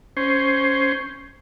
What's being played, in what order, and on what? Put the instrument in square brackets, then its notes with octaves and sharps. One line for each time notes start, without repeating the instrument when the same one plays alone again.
[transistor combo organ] C#4 C5